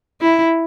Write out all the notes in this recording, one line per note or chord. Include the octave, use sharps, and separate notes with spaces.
E4